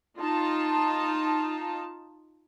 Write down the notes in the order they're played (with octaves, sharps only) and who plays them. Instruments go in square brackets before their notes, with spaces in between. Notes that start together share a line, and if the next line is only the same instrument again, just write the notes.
[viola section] D#4 F4 A5